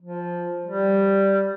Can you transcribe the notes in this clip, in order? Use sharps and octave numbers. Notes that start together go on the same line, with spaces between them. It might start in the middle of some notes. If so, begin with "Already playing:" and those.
F3
G3